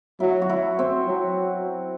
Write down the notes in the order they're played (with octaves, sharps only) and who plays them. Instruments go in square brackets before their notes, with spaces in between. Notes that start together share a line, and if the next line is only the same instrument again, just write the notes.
[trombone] F#3 [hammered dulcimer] E4
[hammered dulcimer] F#4
E4
C4
[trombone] F#3